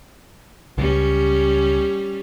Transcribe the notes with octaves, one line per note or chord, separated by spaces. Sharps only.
C#2 G3 C#4